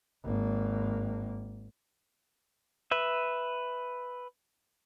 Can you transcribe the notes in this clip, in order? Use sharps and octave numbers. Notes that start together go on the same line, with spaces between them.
G#1 A#3
B4 E5